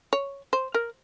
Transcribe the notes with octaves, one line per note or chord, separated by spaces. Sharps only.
C#5
C5
A#4